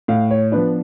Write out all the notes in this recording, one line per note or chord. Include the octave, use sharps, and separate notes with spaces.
A2 F5
C#5
F3 B3 D4 B4